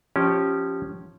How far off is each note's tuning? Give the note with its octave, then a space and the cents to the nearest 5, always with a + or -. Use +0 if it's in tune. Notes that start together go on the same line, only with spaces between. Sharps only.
F3 +0 C#4 -5 G4 -15